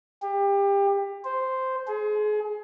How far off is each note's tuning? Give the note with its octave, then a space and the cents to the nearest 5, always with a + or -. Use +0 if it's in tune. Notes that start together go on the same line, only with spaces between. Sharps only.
G4 +25
C5 -5
G#4 +30